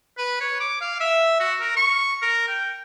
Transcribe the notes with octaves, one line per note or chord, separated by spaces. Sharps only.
B4
C#5
D6
F5
E5
F#4
A#4
C#6
A#4
G5